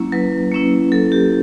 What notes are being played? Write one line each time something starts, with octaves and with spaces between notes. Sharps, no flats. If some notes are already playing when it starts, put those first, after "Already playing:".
Already playing: F#3 A#3 C#4 E4
F#3 B4
A#3 C#4 E4
F#3 A4
G4